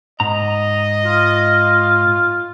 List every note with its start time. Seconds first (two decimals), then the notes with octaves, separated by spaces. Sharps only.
0.20 G#2 D#5 A#5
1.05 F4